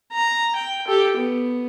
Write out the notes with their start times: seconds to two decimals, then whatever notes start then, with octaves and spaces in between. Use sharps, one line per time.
0.12 A#5
0.55 G5
0.87 G4 A4
1.17 B3